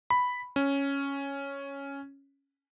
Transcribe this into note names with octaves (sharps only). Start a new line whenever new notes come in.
B5
C#4